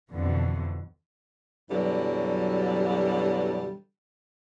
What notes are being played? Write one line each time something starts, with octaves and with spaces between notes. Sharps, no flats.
F2 B2 D3 E3
F#2 B2 D3 E3 F#3 G3